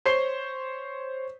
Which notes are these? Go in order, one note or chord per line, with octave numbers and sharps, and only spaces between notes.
C5 C#5 C7 G7